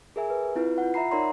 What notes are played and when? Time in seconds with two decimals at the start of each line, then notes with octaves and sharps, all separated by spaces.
0.16 G#4 A#4 E5 G#5
0.30 B4
0.55 C4 E4 F4 B4
0.78 F4 F#5
0.94 E5 F#5 A#5 B5 C7
1.11 D#4 A#4 C#5 D5 A#5 C6